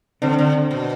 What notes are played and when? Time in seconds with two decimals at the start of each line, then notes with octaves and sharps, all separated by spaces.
0.22 D3 C4 D4
0.38 D3
0.71 B2